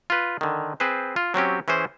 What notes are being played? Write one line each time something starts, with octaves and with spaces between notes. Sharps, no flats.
F4 B4
D3 D#3
C4 G#4 B4 C5
F4
F#3 C4 C#4 G4
E3 C#4 E4 G#4 C5